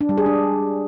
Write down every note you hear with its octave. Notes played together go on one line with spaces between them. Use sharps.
D4
G3
G#4
D4